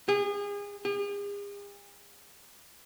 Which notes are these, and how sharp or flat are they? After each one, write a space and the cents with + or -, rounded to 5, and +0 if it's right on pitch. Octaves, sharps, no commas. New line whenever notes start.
G#4 -35
G#4 -45